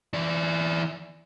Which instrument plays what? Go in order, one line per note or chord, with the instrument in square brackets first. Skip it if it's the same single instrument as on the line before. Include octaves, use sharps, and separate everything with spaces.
[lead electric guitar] E3 D5